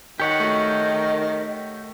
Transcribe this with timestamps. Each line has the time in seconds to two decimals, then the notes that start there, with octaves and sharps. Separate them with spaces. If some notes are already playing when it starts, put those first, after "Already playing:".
0.20 D#3 G4 C#5 D#5 F#5
0.40 A3 F#4